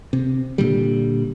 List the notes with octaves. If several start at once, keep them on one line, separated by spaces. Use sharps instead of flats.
C3
A#2 D3 G3